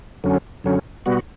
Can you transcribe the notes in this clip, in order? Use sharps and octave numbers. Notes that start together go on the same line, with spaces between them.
F#2 D3 F#3 C#4
F#2 D3 F#3 C#4
B2 G3 B3 F#4